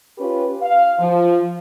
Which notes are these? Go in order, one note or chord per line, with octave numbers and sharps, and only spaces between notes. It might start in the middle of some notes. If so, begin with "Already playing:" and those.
C#4 F4 G4 B4
F5
F3